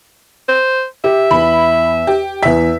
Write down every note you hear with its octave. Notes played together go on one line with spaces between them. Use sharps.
C5
G4 E5
E2 B5
G4
E2 E5 B6